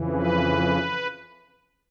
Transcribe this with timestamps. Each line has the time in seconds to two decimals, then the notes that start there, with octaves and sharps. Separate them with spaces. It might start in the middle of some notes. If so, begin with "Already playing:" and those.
Already playing: F2 C#3 E3
0.13 B4